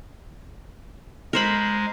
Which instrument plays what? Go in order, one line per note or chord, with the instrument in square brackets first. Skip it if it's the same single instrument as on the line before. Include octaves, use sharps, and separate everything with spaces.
[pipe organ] G#3 [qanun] A#4 C5 B5